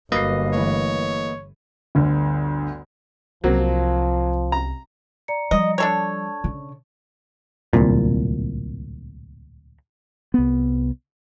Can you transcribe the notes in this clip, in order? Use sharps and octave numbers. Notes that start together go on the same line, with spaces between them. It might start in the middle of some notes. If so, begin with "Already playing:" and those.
G1 F#3 A#3 B4 D#5 C7
E3 A3 C#5
G1 D2
C2 F3 F#3 A#3 C4
A#5
D5 A#5 C#7
F3 G3 D#5
D4 A4 C#5 A5 G#6
C#3
D1 G1 C2 A#2
C2 B3